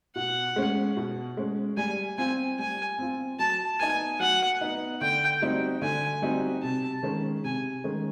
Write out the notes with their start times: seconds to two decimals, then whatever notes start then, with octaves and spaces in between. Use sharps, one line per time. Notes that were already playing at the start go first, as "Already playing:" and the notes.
0.16 B2 F#5
0.56 G#3 C#4
0.97 B2
1.37 G#3 C#4
1.77 G3 G#5
2.18 C4 F4 G#5
2.59 G3 G#5
2.99 C4 F4
3.39 F#3 A5
3.80 B3 D#4 G#5
4.20 F#3 F#5
4.61 B3 D#4
5.01 D3 G5
5.42 G3 C4 D#4 F#4
5.82 D3 G#5
6.22 G3 C4 D#4 F#4
6.62 C3 A5
7.03 D#3 G#3 C#4
7.44 C3 G#5
7.84 D#3 G#3 C#4